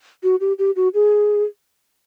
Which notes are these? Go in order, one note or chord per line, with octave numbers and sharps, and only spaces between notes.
F#4
G4
G4
F#4
G#4